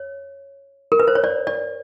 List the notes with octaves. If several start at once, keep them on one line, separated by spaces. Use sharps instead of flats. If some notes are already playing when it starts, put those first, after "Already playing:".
Already playing: C#5
A#4
B4
C5
C#5
D5
D5